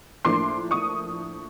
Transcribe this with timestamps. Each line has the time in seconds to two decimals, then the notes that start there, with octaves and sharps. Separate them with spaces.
0.25 A2 F3 A#3 D4 C6 D6
0.71 C#6 D#6